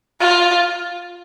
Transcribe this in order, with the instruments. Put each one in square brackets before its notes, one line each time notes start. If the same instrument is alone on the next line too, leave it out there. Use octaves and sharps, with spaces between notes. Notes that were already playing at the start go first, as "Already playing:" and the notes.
[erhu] F4